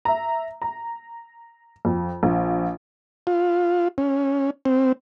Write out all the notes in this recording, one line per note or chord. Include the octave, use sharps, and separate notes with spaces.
E5 A#5
A#5
F2
A#1
F4
C#4
C4